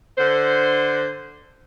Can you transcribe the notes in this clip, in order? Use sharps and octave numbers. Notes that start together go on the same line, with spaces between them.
D3 C5